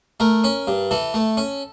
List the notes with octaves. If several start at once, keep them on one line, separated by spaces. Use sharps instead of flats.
A3 A#4
C#4
G2
E3 A4
A3
C#4